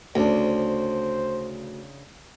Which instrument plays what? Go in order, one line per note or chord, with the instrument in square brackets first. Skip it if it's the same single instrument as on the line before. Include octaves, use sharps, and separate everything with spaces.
[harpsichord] D2 [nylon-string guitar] C#3 D4 [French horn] C5